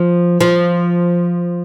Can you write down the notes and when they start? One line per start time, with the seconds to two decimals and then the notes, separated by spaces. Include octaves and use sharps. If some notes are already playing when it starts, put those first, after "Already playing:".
Already playing: F3
0.41 F3